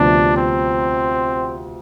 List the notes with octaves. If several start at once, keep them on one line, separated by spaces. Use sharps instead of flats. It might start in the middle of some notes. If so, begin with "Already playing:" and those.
Already playing: D2 C3 F3 B3 D4
C4